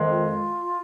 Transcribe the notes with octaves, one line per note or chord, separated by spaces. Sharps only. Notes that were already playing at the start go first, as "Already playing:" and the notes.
Already playing: F2 D#3 G#3
F4